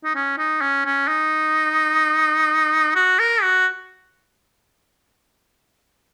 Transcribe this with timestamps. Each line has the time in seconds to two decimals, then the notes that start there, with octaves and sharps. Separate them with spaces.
0.05 D#4
0.15 C#4
0.38 D#4
0.62 C#4
0.85 C#4
1.08 D#4
2.95 F#4
3.19 A#4
3.42 F#4